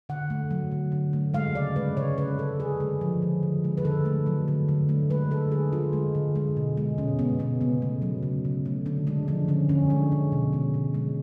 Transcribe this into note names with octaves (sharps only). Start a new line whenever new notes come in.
D3 F#5
A3
F#3
D3
D3
A3
G#3 F5
C#3 D5
G#3 B4
C#3 C#5
G#3 B4
C#3 A4
D3 G#4
G#3
F3
D3
D3
G#3
B4
D3 A4
A3
F#3
D3
D3
A3
G#3 B4
D3 A4
G#3 G#4
D3 F4
G#3
D3
G#3
B2
G#3
B2 C#4
G#3 B3
B2 B3
C#3 B3
A3
F#3
C#3
C#3
A3
D3 D4
G#3 D4
F3 D4
D3 C#4
D3 C#4
G#3 D4
G#3
B2
G#3
B2
G#3